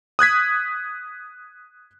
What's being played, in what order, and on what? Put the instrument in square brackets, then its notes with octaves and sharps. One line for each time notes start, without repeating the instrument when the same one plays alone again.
[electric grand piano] D#6 F#6 G#6 B6